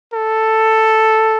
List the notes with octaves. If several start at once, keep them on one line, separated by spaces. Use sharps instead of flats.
A4